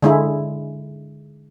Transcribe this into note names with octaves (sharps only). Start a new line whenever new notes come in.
D3 G#3 E4